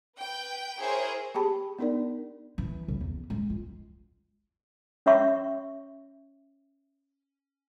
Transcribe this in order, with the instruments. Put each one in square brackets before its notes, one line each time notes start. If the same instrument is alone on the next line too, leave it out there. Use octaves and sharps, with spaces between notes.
[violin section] B4 G5
E4 G#4 A#4 C5 C#5
[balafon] G4 G#4 G5 A5 B5
B3 D4 D#4 A#4 D5
[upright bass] E3
C2
E2
G#3
F4
[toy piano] C#4 C#5 E5 C#6